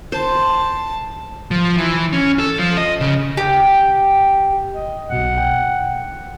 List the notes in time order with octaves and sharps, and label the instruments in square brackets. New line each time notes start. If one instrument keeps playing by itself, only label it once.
[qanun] C5 [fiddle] A5
[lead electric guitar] F3
E3
C#4
A4
F3
D#5
C#3
[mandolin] G4
[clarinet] D#5
[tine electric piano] B1 B2 [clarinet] F#5
[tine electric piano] G5